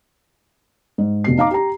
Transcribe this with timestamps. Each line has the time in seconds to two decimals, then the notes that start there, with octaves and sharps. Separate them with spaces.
0.98 G#2
1.24 F1 B2 C7
1.38 D#4 F5 A#5 D6
1.51 G4 A#5